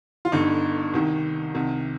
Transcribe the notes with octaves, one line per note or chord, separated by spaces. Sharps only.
F4
G1 G2 D3 D#4
C2 C3 D#3
C2 C3 D#3